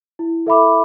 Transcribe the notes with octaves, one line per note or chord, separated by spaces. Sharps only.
E4
A4 E5 B5 D6